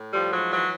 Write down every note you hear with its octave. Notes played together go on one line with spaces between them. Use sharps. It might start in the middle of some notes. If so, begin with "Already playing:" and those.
Already playing: A2
F3 G3
G#2 F#3
E3 F#3